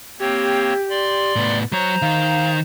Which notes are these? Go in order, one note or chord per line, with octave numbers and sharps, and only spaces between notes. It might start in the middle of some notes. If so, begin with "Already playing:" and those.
A#3 C4 G4 C#5
D5 C6
A2 B3
F#3 C5 C#5 A#5
D#3 F5